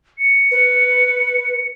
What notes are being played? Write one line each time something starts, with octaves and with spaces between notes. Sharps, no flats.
C#7
B4